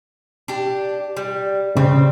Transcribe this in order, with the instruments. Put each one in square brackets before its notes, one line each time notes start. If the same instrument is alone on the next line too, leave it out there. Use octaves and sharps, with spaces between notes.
[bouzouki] D4 G4
G3
[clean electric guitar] C#3 [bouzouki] G3 C4